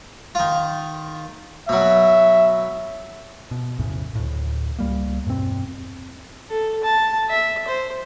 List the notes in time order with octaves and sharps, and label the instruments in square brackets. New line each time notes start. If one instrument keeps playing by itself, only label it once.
[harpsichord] D#3 F4
[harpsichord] B2 F#3 [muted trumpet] E5
[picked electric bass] B2
B1 F2 A2 C#3
D2 A2
C#2 G3 A#3
E2 G2 B2 C4
[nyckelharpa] A4
A5
E5
C5